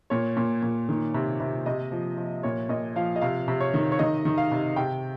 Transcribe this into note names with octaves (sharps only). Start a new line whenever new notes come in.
A#2 C#5
A#2
A#2
D#3
C3
C3
C3 D#5
F3
F3
A#2 C#5
A#2 D#5
F3 F5
D#5
C3 F5
C3
C#5
D#3
C#5
D#3 D#5
D#3
F5
C3
C3 G5